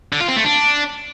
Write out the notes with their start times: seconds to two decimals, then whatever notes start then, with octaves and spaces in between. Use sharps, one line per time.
0.13 D3
0.21 F4
0.28 C4
0.36 A3
0.44 D4